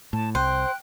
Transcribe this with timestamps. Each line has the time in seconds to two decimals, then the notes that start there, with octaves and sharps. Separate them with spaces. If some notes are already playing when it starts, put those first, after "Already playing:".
0.13 A2 A5
0.35 C2 C5 G5 F#6